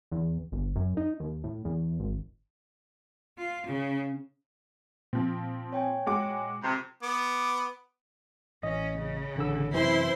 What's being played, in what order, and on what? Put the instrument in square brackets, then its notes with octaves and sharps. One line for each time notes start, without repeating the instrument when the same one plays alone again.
[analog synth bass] E2
G1
F#2
D#4
D#2
A2
E2
G#1
[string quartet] F4
C#3
[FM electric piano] A#2 [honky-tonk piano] F3 C4
[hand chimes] C#5 G5 G#5
[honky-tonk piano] G#3 F#4 D6
[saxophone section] F2 C3
[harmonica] B3 D6
[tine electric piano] A1 D#5 [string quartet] C#4
[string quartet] C#3
[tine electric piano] A1 D3 E6
[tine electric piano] F#2 C3 E3 [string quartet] E4 C5 C6